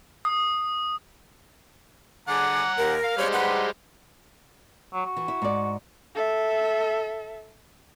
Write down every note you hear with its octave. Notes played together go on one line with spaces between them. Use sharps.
D#6
D3 G#4 F#5 A#5 D6
D#2 A#4
F5
G3 G#3 C5 C#5
D#4 G4 B4 F#5
F#3
F#4
E3
E4
G#2 D5
A4 E5